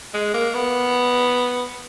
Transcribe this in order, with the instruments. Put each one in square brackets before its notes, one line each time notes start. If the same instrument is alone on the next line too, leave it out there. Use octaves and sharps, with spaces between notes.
[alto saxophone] G#3
A#3
B3